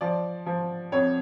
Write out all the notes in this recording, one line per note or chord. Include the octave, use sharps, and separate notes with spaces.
F3 D5
F3
F2 C#5